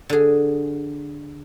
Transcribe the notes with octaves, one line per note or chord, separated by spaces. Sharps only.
D3 G#4